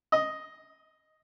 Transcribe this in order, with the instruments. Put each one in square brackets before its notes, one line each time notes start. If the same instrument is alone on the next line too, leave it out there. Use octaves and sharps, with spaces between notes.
[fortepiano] D#5